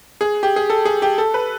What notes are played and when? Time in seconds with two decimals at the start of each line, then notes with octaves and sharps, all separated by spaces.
0.21 G#4
0.43 G4
0.56 G#4
0.70 A4
0.85 G#4
1.02 G4
1.18 A4
1.34 B4